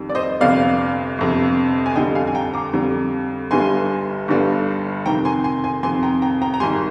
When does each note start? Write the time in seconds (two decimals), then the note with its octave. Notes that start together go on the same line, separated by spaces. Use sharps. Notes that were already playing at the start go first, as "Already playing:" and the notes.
Already playing: F2 D#3 G3
0.09 D5
0.15 C5 D#5
0.41 G1 F2 C3 D5 F5
1.18 G1 F2 C3
1.86 G#5
1.96 F2 D3 G3 D#5 G5
2.15 F5 G#5
2.27 G#5
2.35 G5 A#5
2.54 A#5 D6
2.73 F2 D3 G3
3.51 G1 G2 D3 G3 G#5 C6
4.28 G1 G2 D3 G3
5.06 F2 C3 D#3 G5 A#5
5.25 G#5 C6
5.44 G#5 C6
5.64 G#5 C6
5.83 F2 C3 D#3 G#5 C6
6.03 G5 A#5
6.22 G5 A#5
6.42 G5 A#5
6.54 A#5
6.60 G#1 G#2 G3 G#5 C6